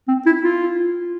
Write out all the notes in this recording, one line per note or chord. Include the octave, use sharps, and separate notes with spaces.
C4
E4
F4